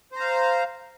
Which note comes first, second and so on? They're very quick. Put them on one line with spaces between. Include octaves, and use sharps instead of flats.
C5 A#5 F5